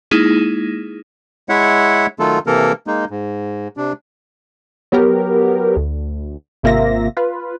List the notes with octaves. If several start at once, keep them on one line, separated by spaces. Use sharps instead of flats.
G#3 A#3 D#4 E4 G#4
G#3 E4 C#5 E5 F#5
D#3 F#3 A3 F4 A4
C3 E3 A#3 A4 A#4
G#3 A#3 D#4
G#2
C3 D4
F#3 B3 G4 A#4
D2
G#1 C3 A#3 F4 E5 A#6
F4 B4